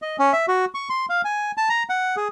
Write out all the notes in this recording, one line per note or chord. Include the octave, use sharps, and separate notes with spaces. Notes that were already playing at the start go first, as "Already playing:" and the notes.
D#5
C#4
E5
F#4
C#6
C6
F5
G#5
A5
A#5
F#5
G#4